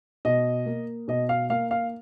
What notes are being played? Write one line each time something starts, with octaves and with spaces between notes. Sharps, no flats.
B2 D#5
A#3
B2 D#5
F5
A#3 F5
F5